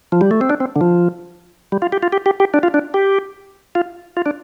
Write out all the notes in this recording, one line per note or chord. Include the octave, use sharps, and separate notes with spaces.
F3
G3
A3
C4
D4
C4
D3
F3
G3
F4
G4
F4
G4
G4
G4
D4
F4
D4
G4
F4
F4
D4